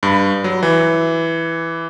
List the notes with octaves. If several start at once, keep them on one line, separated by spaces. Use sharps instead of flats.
G2 B5
F#3
E3